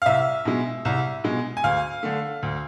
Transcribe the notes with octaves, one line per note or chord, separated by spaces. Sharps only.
F5
C2 E5
B2 G#3
C2
B2 G#3
G#5
D2 F5
D3 A3
D2